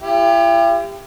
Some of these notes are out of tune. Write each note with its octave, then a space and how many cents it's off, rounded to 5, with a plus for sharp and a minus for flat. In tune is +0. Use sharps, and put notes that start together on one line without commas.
E4 +45 G4 +25